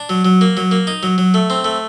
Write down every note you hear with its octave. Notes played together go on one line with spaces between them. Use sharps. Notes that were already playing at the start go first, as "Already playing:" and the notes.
Already playing: D4
F#3
F#3
A#3
F#3
A#3
D#4
F#3
F#3
A3
C4
A3